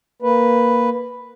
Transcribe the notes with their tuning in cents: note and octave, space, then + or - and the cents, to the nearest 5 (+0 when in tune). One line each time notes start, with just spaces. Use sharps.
A#3 +0 B4 +0